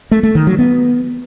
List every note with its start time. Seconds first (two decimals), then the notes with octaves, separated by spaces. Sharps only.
0.11 A3
0.23 A3
0.35 D#3
0.47 F#3
0.59 B3